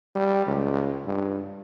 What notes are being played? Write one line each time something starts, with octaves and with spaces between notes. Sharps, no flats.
G3
C#2
G2